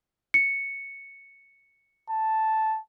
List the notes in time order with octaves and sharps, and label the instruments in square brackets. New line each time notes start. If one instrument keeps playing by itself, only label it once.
[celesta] C#7
[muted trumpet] A5